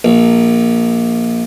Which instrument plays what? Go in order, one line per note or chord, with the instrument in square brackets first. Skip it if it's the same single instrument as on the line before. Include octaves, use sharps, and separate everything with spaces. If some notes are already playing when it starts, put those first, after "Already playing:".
[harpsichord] A#1